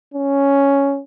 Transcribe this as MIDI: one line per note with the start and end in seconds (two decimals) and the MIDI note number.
0.14 1.01 61